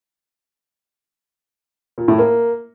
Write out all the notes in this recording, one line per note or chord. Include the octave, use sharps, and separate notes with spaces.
A#2
A2
A#3